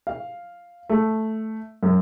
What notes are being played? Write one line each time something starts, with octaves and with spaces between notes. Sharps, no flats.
F5
A3
F#2